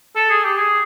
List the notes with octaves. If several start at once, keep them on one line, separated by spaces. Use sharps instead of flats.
A4
G#4
G4
G#4